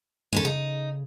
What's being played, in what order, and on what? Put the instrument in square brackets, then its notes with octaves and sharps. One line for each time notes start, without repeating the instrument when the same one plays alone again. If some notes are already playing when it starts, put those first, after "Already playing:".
[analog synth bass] G#2 [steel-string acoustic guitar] G#3 C#4 A4
[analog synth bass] C#3 [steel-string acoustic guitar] D#4